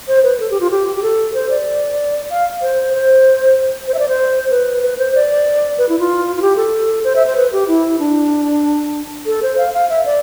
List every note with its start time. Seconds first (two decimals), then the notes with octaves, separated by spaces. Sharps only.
0.08 C5
0.23 B4
0.40 A4
0.51 G4
0.60 F4
0.71 G4
0.96 G4
1.03 A4
1.34 C5
1.50 D5
2.30 F5
2.62 C5
2.93 C5
3.88 C5
3.94 E5
3.99 D5
4.08 C5
4.51 B4
4.82 B4
4.98 C5
5.15 D5
5.78 B4
5.89 E4
5.99 F4
6.37 F4
6.42 G4
6.56 A4
7.04 C5
7.16 E5
7.26 C5
7.37 B4
7.52 G4
7.68 E4
7.99 D4
9.26 A4
9.43 C5
9.58 F5
9.74 F5
9.89 E5
10.05 D5